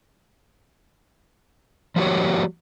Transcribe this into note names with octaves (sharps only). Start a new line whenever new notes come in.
F3 G3 A#3 F#4 G4 C#5